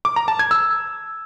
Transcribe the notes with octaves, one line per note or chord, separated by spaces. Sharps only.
D6
A#5
A5
G#6
E6